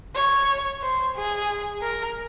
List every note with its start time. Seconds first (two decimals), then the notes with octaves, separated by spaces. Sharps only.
0.15 C#5
0.82 C5
1.16 G#4
1.82 A#4